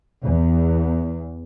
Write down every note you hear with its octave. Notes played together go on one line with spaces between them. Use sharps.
E2